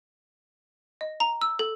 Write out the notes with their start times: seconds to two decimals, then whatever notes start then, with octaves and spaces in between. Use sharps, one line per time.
1.01 D#5
1.20 A#5
1.41 E6
1.59 A4